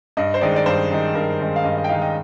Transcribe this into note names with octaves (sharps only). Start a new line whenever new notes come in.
G2 D#5
C5
D#3 G#3 D#4 D5
D5
G2 C5
D#3 G#3 D#4
G2 A#4
D#3 G#3 D#4
F5
G2 D#5
D#5
G5
D#3 G#3 D#4 F5
D#5